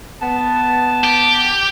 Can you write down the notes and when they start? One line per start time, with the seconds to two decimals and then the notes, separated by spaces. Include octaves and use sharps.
0.22 B3 A5
1.04 G4